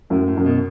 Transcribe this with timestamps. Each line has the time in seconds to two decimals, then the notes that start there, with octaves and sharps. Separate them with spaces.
0.10 F#2 A2
0.28 A2
0.37 F#2
0.46 B2